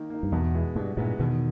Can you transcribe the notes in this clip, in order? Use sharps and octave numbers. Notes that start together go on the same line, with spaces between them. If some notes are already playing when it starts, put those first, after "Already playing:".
Already playing: D#3 A#3 D#4
A#3 D#4
G2
E2 B2
G#3 B3 E4
G2 B2
G2 A#2 G#3 B3 E4
E2 B2 D#3